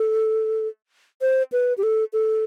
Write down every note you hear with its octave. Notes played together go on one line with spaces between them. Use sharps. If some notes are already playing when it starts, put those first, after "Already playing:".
Already playing: A4
C5
B4
G4
A4
A4